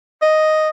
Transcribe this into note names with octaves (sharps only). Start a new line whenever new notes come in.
D#5